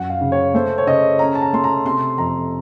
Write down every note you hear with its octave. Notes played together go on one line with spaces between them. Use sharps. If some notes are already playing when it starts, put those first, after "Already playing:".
Already playing: F#2 F#5
F5
C#3
C#5
A3 C5
C#5
C#3 D#5
C#4 A#5
A5
A#5
A3 C6
A#5
C3 C6
F2 A#5